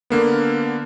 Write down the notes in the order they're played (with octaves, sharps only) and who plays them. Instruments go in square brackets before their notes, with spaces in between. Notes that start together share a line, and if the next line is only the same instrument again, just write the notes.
[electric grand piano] D3 A#3 B3